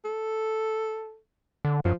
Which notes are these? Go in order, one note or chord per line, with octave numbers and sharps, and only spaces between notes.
A4
D3
F#2 F3